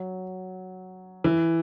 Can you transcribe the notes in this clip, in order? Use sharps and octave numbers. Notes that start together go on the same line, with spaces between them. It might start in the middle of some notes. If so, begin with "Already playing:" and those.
Already playing: F#3
E3